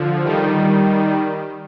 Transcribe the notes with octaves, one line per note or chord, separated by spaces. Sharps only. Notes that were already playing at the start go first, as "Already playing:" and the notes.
Already playing: D3 F3
D#3 G3